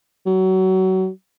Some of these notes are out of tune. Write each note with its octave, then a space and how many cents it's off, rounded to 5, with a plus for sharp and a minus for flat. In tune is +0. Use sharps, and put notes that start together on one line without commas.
F#3 +25